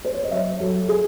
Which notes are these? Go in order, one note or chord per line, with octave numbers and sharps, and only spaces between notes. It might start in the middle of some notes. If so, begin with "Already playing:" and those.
C5
C#5
D#5
F#3 C#5 E5
F#3 F#4 A4
G#4